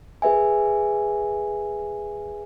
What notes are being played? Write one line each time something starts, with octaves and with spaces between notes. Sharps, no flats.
G#4 B4 E5 G#5